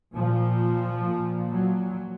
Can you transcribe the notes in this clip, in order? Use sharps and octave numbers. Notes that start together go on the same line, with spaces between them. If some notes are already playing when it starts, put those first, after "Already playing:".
A#2 F3
A#2
F#3